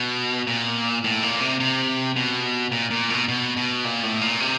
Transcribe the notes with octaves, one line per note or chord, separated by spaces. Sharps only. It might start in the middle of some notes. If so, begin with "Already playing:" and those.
Already playing: B2
A#2
A2
A#2
C3
C3
B2
A#2
A#2
B2
B2
B2
A#2
A2
A#2
C3